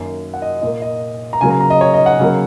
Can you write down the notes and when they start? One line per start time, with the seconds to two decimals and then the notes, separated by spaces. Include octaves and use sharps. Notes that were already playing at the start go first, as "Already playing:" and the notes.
Already playing: F#2 D#3 A#3
0.34 F#5
0.42 D#5
0.62 A#2 A#3 D#5
0.82 D#5
1.33 A#5
1.41 C#3 F#3 A#3 G#5
1.50 A#5
1.61 A#5
1.70 D#5
1.81 C#5
1.94 D#5
2.06 F#5
2.19 C#3 F#3 A#3